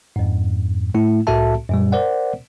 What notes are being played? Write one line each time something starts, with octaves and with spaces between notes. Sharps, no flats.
F2 G#2
A2 A3 E4
C2 A2 F#4 A4 E5 A5
F#2 A#2 G3
A#4 C5 D5 F#5